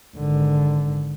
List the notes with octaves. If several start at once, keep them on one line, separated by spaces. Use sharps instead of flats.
G#1 D3